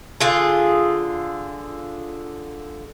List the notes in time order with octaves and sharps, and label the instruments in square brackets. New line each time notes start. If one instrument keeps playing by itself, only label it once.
[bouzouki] D3 F4 G#4